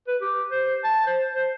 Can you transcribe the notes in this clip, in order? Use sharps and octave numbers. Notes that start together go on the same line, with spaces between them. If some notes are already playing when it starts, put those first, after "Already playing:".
B4
G4
C5
A5
C5
C5